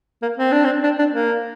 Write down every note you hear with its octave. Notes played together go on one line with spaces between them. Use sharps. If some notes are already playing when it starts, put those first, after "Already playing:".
A#3
C4
D4
C4
D4
D4
A#3